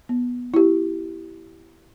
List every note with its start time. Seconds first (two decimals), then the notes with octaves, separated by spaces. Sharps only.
0.09 B3
0.54 E4 G4